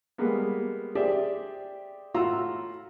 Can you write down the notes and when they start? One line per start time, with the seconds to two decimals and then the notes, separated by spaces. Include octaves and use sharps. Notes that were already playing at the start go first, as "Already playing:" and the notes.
0.18 G3 G#3 A#3 B3
0.95 G4 G#4 C5 D5 E5
2.14 A2 F4 F#4 A#5 C6 E6